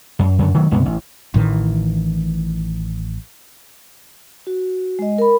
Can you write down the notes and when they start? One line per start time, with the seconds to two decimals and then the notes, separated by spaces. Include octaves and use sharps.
0.19 F#2
0.39 F#2 D3
0.55 D#3 F#3 A3
0.71 C#2 G2 C3 B3
0.85 A1
1.34 A1 A2 D#3 E3
4.47 F#4
4.99 G#3 D#5
5.18 A#4 B5